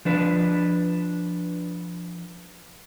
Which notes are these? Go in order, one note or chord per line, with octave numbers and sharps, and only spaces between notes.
F3 D4 B4